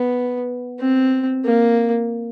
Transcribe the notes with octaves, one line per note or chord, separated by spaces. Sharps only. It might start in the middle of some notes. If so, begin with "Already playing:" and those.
Already playing: B3
C4
A#3